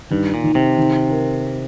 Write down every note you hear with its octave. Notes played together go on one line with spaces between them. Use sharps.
G2 D#3
A#2
D#3
C3
D#3
A#4